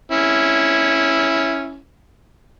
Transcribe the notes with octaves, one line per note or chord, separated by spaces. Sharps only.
C#4 E4